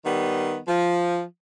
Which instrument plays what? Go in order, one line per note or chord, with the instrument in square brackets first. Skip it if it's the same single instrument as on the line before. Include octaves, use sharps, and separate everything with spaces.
[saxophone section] D#3 G3 B3
F3